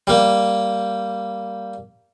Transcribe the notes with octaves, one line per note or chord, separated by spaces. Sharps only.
G3 A#3